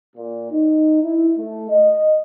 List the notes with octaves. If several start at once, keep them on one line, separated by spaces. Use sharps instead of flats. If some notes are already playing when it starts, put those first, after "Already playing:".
A#2
D#4
E4
A3
D#5